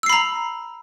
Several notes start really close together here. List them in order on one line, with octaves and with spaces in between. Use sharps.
E6 C7 B5 A#5